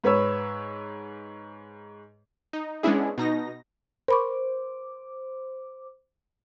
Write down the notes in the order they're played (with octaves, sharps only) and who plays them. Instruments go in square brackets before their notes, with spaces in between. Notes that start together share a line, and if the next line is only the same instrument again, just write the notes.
[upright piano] G#2 B4 C#5 E6
[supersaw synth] D#4
G#3 B3 C#4 D4 E4 G#4
B2 D#4 A#6
[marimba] A#4 B5 C#6 [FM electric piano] C5 D6